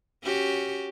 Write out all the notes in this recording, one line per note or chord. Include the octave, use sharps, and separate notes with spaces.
C#4 F#4 G4